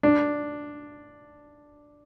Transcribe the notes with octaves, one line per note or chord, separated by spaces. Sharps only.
D4